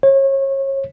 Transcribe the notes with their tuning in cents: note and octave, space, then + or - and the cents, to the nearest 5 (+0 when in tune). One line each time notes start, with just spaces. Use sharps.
C#5 -30